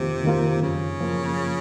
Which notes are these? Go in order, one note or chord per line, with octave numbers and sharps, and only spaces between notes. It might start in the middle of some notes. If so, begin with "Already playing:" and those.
Already playing: F2 C3 D#3 A#3 F4
D#3 A#3 F4
F#2 C#3
F3 A#3 F4